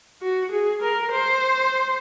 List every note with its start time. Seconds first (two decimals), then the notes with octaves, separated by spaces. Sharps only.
0.22 F#4
0.52 G#4
0.82 A#4
1.12 C5